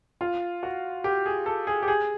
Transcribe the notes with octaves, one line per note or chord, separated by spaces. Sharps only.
F4
F#4
G4
G#4
A4
G#4
G4
G#4